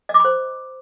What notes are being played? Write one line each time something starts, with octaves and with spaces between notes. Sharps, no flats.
D#5
D6
B5
C5